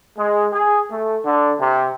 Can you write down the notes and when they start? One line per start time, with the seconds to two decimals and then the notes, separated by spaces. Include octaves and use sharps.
0.18 G#3
0.53 G#4
0.90 A3
1.25 D3
1.60 C3